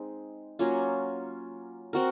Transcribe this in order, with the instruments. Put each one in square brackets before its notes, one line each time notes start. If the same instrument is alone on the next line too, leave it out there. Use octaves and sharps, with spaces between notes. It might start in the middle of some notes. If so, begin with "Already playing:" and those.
Already playing: [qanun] G#3 C4 D#4
F#3 A#3 C#4 F4
C4 F#4 A#4